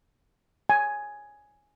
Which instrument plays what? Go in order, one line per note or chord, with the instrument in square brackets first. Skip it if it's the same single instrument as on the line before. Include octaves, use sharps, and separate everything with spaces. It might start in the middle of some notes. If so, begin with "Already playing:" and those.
[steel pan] G#5